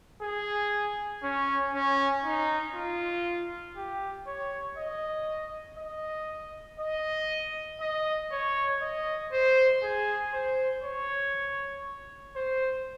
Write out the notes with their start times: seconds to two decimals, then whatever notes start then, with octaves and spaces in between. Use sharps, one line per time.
0.22 G#4
1.23 C#4
1.74 C#4
2.25 D#4
2.75 F4
3.77 G4
4.27 C#5
4.78 D#5
5.78 D#5
6.80 D#5
7.81 D#5
8.31 C#5
8.81 D#5
9.32 C5
9.83 G#4
10.34 C5
10.84 C#5
12.36 C5